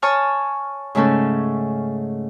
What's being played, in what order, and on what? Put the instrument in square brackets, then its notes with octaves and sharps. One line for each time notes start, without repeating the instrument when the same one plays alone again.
[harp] C#5 G#5 A5 C#6 D#6 F6
G#2 C#3 A3 C#4 A4